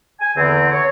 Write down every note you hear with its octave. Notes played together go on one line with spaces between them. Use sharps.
G#5
E2 D3 C4
C#5